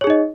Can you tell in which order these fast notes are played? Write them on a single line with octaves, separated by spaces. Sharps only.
C#5 G#4 D#4 D#5